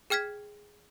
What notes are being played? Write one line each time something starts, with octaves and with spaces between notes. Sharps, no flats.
G#4 G5 F6 G#6 B6